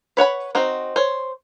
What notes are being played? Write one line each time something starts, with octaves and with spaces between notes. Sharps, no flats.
B4 C#5 F#5 B5
C4 D#4 F#4
C5 C#5